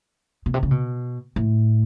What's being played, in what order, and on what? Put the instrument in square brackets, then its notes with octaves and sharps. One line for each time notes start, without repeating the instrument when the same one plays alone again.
[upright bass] B2
C3
C#3
B2
A2